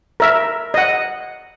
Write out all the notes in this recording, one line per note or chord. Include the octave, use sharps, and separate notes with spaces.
A#4 E5
D#5 F#5